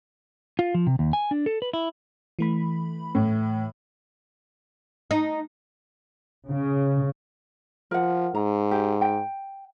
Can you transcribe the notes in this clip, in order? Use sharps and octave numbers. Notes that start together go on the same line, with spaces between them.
F4
F3
C3
D#2
G#5
D4
A4
B4
E4
E3 A3 B5
A2
D#4
C#3
F3 A#4 F#5
G#2 A#5
G4
G5